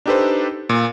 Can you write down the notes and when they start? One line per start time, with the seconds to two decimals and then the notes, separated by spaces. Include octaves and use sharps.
0.06 D4 D#4 G4 A4 B4 C5
0.69 A#2